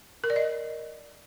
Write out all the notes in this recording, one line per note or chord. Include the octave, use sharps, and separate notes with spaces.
A#4
D5
D#5